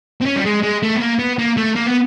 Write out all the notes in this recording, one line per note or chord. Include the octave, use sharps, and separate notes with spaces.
C4
C#4
G3
G#3
G#3
A3
B3
A#3
B3
A#3
A3
A#3
B3